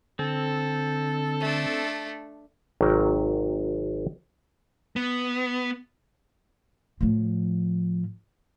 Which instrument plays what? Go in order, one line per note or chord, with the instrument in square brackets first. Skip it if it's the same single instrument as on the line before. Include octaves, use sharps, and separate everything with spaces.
[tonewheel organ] D3 [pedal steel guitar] C4 [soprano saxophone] A4
[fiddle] A3 D4
[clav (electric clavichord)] G#1 C3 F#3 A#4 G5
[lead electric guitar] B3
[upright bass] A2 F3